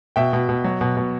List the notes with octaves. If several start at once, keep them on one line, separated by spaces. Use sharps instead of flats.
B2 E5 G5
B2
B2
F#3
B2
B2